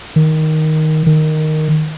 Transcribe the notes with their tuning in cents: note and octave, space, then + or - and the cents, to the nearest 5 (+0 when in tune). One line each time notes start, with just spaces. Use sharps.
D#3 +5
D#3 -5